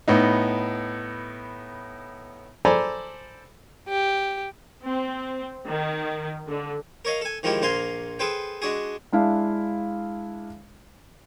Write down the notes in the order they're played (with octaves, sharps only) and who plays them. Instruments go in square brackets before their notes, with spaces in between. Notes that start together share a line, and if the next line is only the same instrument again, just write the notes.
[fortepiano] A2 B3 D#4
A4 C5 D5 G#5 A#5 B5
[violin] G4
[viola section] C4
D#3
D3
[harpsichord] A#4 C#5 D#5 F5
A4 G#5
D#3 F3 G#3 E4 G4
A#1 A#3 C5 F5 G#5 C6
G#4 A4 B4 C5 G5
G#3 D4 F#4 G#4
[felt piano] G#3 D4 E4 F5